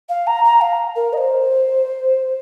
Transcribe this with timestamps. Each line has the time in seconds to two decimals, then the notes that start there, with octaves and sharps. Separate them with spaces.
0.09 F5
0.26 A#5
0.44 A#5
0.61 F5
0.95 A#4
1.13 D#5
1.17 C5